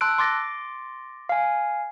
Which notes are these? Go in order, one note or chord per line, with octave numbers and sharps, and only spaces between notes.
A5 C6 E6 F#6 D7
C6 D6 A6 A#6 D7
F5 G#5